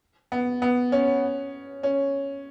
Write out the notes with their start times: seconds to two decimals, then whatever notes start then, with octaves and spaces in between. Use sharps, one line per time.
0.32 B3
0.62 B3
0.92 C#4
1.83 C#4